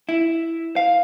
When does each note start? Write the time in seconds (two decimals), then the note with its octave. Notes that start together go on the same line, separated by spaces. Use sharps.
0.09 E4
0.76 F5